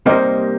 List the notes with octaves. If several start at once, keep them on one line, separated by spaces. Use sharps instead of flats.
C3 G3 A#3 D#4 A#4 C5 D#5